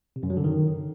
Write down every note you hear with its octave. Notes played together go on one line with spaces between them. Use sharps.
C3
F#2
F#3
D3
D#3